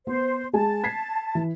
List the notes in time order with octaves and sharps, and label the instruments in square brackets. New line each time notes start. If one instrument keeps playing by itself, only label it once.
[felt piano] B3 [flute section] C5
[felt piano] G#3 G#5 [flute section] A5
[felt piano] G#6 B6 C7
E3